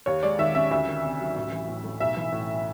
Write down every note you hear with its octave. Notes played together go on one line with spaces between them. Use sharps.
D#2 C#5
G#3 D5
D#3 E5
C#4 E5
D2 E5
D#3
C3
F#3
A1
E3
A2
A3
B1 E5
E3
A2